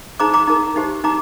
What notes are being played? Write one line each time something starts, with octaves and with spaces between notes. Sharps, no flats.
D#4 G#4 C5 A#5 D6
A#5 D6
D#4 A#4
D#4 G4 C5
D#4 A#5 D6